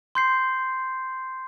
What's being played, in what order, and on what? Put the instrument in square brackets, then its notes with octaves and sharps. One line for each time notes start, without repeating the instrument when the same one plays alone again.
[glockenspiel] C6 G6 C7